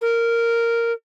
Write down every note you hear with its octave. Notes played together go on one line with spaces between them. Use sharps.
A#4